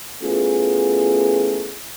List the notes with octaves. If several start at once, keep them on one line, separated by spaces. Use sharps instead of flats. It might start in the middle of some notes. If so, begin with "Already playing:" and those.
A3 B3 C#4 E4 F4 G#4